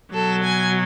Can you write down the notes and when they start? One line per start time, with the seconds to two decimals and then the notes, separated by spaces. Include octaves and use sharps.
0.13 B2 F#3 A4
0.44 G#5